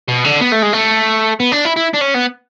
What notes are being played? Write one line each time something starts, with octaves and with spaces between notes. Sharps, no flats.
B2
D3
B3
A3
G#3
A3
B3
D4
E4
E4
D4
C#4
B3